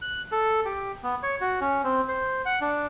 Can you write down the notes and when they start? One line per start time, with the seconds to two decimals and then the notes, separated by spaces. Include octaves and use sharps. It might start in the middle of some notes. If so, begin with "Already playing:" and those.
0.02 F#6
0.32 A4
0.65 G4
1.03 B3
1.23 C#5
1.41 F#4
1.61 C#4
1.84 C4
2.08 C5
2.46 F#5
2.61 D4